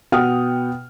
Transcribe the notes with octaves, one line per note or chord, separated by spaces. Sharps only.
B2 F#5 G5 D#6 F6